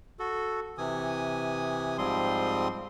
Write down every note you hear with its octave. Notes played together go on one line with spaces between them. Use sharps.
F#4 A4
C3 E3 G#5 D#6
G#2 F3 G3 C4 C6 D#6